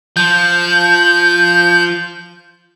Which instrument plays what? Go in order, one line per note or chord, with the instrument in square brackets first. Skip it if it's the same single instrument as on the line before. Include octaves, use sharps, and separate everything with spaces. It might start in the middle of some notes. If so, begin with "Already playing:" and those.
[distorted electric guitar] F3 [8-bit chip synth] G6